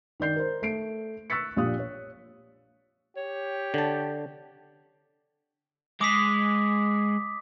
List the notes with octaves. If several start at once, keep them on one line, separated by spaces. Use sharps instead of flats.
D#3 D5 G6 C7
A#4 C5
A3 C7 D7
C#6 E6 F#6 A6 B6 C#7
A#1 A#2 G4 F5 D#6 F#6
C#5
G4 C#5
D3 A5
G#3 D6 D#6 B6